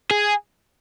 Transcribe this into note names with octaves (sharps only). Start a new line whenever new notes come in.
G#4